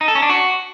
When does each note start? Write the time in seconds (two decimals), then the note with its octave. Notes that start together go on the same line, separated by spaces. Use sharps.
0.01 D#4
0.08 A4
0.15 C#4
0.22 D4
0.30 F#4